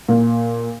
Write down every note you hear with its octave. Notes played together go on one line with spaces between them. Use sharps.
A#2